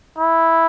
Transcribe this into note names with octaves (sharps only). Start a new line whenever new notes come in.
E4